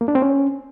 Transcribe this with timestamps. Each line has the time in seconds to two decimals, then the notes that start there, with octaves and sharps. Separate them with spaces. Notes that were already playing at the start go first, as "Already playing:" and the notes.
0.01 A#3
0.08 D4
0.15 C4
0.22 C#4